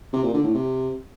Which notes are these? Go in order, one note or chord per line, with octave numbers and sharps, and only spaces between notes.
C3
A#2
D3
A2
C3